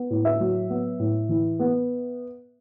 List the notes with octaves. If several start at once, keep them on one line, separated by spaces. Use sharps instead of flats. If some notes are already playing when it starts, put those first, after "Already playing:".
Already playing: B3
A2
E5
F#3
B3
A2
E3
B3